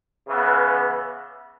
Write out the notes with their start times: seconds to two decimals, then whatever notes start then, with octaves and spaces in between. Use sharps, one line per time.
0.27 C#3 E3 B3